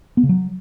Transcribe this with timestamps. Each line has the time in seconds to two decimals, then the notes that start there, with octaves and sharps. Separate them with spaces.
0.17 B3
0.23 C#3
0.29 F#3